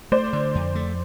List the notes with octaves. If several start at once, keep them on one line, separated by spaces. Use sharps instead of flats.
A3 C5 D5
D3
F2
A3